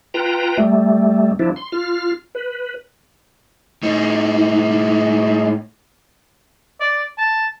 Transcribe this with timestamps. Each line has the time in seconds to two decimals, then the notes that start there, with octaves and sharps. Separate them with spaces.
0.14 F4 B4 G5 A#5
0.57 G3 A3
1.39 F3 D4 E4
1.56 C6
1.72 F4 F6
2.35 B4
3.83 A2 D#4
6.80 D5
7.18 A5